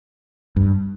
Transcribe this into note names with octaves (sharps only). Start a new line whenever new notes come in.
G2